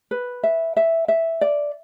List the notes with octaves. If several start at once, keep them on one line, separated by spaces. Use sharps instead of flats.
B4
E5
E5
E5
D5